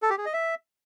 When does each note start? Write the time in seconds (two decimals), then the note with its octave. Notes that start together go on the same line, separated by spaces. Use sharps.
0.02 A4
0.10 G4
0.18 G#4
0.26 D#5
0.33 E5